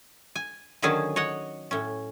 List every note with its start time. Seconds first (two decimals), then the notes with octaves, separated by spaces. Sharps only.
0.35 G#5
0.82 D3 D#3 F#3 C#4 G#4 A5
1.16 C#5 D#5 F#5
1.71 A2 C#4